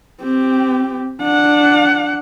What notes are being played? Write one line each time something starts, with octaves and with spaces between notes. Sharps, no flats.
C4 G4
D4 F#5